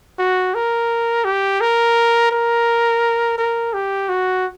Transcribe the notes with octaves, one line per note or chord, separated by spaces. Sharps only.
F#4
A#4
G4
A#4
A#4
A#4
G4
F#4